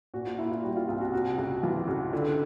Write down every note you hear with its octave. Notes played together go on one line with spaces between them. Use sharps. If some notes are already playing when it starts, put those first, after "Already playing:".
A#2 F#4
F4
A#3 E4
F4
G3 F#4
F4
C2 F4
F#4
C3 F#4
C#2 F#4
E3 F4
C#2 F#4
D3 F4